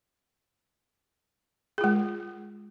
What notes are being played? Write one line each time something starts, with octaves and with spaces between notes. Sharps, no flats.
G#3 F4 G#4